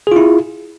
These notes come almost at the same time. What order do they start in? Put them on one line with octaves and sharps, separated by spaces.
G#4 F4 E4